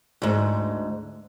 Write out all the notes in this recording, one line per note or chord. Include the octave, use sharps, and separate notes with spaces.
D2 G#2